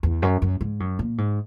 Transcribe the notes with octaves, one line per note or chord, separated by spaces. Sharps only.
E2
F#2
F#2
G#2
F#2
A#2
G#2